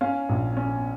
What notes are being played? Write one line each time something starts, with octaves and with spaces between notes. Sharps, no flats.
C#4 F5
A#1
C#4